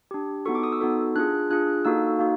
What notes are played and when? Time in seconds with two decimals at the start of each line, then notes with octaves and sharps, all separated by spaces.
0.11 D4 G4
0.46 B3 D#4 F#4 A4 C#6
0.55 D6
0.63 D#6
0.72 E6
0.81 B3 D#4 F#4 A4
1.15 D4 F4 G#4 F#6
1.50 D4 F4 G#4 F#6
1.85 A#3 D#4 F#4 A4 E6
2.19 A#3 D#4 F#4